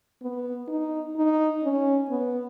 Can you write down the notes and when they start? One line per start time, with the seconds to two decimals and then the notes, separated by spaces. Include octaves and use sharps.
0.22 B3
0.68 D#4
1.17 D#4
1.64 C#4
2.10 B3